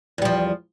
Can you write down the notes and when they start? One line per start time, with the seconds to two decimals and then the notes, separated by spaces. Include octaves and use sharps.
0.18 E2
0.22 G3
0.25 F3